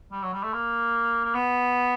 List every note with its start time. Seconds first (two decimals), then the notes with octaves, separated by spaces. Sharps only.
0.12 G3
0.23 F#3
0.33 G3
0.44 A3
0.53 A#3
1.24 A#3
1.35 B3